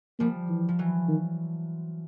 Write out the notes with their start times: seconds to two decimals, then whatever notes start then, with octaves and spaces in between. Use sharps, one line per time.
0.19 F3 G3 A#3
0.50 E3
0.69 F3
0.79 E3 F#3
1.08 D#3